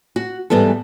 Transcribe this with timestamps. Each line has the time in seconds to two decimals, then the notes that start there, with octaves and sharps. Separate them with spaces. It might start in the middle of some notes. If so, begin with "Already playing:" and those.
0.16 F#4
0.50 G#2 E3 G3 B3 A4